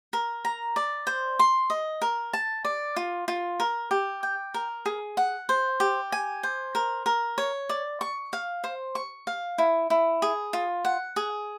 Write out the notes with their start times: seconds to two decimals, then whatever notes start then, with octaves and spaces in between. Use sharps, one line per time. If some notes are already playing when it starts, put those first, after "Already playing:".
0.13 A#4
0.45 A#5
0.76 D5
1.07 C5
1.39 C6
1.70 D#5
2.02 A#4
2.33 A5
2.65 D5
2.96 F4
3.28 F4
3.60 A#4
3.91 G4
4.23 G5
4.54 A#4
4.86 G#4
5.17 F#5
5.49 C5
5.80 G4
6.12 G#5
6.43 C5
6.75 A#4
7.06 A#4
7.38 C#5
7.69 D5
8.01 C#6
8.33 F5
8.64 C5
8.95 C#6
9.27 F5
9.58 E4
9.90 E4
10.22 G#4
10.53 F4
10.85 F#5
11.16 G#4